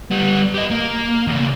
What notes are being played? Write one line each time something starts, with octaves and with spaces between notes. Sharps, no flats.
G3 B3
G4 D#5
A#3
E2 C#3